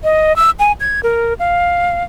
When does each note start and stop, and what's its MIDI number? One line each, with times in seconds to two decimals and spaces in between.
0.04 0.35 75
0.36 0.50 88
0.59 0.72 80
0.80 1.00 92
1.03 1.34 70
1.39 2.03 77